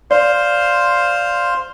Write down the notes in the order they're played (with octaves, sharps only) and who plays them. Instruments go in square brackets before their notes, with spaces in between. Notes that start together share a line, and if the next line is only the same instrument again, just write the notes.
[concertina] C5 F5 C6 [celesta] D5